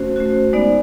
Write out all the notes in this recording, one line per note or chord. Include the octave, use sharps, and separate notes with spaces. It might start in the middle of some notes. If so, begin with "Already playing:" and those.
Already playing: A3 C#4 F#4 C5
A3 C#4 F#4
G#3 B3 D#4 D5